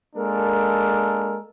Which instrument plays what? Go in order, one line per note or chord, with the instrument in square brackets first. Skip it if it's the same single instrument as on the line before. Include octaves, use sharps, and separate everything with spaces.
[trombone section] G#3 A#3 D4 A4 A#4